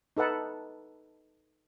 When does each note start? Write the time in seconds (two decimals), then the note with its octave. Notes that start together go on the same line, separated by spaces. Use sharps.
0.17 D#4 A4 B4 F#5 A5